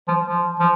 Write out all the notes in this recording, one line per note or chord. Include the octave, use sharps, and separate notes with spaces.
F3
F3
F3